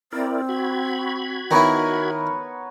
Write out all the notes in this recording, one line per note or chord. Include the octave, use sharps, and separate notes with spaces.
C4 E4 A#4 D5
F#4 B5 G#6
D#3 B3 E4 A#4 C#5 A#5